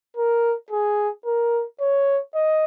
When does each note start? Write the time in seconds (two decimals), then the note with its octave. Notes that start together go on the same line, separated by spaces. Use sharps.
0.17 A#4
0.71 G#4
1.26 A#4
1.81 C#5
2.35 D#5